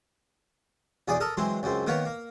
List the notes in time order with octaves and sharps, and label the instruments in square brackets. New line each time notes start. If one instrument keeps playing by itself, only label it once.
[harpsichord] B1 E2 G#4 D5 D#6
A4 A#4 D#6
E3 F#3 G#3 C4
C#2 F#2 C4
D#3 A#3 B3 B4 C#5
A#3